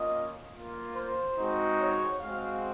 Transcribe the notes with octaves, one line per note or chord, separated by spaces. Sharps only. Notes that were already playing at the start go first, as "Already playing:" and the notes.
Already playing: A#3 C#4 F4 D#5
A#3 F4
C5
G#3 C4 D#4 F#4
C#5
G#3 C4 F#4 F5